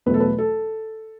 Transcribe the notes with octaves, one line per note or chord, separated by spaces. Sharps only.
E2 B2 F#3 A3 B4
A4
B4
A4